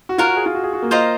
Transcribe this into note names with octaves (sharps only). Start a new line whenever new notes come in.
F#4
F4 A#4 C#5 F#5
F#4
G#4
F4
F#4
G#4
F#4
A#3
F4 C5 D#5 A#5